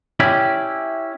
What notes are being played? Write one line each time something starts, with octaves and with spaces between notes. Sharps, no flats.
C#4 E4 G4 D5